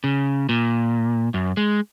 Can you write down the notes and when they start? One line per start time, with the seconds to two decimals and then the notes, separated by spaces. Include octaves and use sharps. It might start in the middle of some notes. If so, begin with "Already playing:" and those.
0.04 C#3
0.49 A#2
1.34 F#2
1.57 G#3